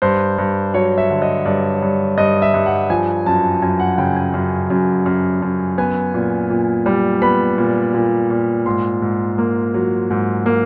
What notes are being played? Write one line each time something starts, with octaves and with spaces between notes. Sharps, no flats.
G2 C5
G2
F#3 C#5
E5
D3
D#5
G2 D5
G2
G2 D#5
E5
G2
F#5
F3 G#5
F#2 A5
F#2 G#5
F#5
C#3 G5
G#5
F#2
F#2
F#2
F#2
B3 G#5
A#2
A#2
G3
B3 B5
A#2
A#2
A#2
G#2 C6
G#2
A#3
F#3
G#2
A#3